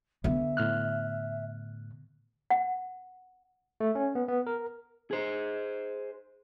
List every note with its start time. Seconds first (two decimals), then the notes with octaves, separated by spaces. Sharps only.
0.24 D3 B3 E5
0.57 A2 F6 F#6
2.50 F#5
3.80 A3
3.95 C#4
4.15 B3
4.28 B3
4.47 A#4
5.11 G#4 C5